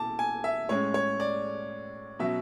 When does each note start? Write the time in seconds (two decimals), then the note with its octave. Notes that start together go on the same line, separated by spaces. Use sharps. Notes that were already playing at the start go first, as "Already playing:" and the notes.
Already playing: B2 E4 A5 D6
0.19 G#5
0.44 E5
0.69 A2 G#3 C#4 C#5
0.94 C#5
1.20 D5
2.19 B2 F#3 C#4 E5